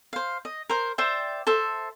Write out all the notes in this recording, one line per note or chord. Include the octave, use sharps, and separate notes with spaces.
C5 F5
D#5
A#4 C5
C5 D5 E5 G5
A4 C5 E5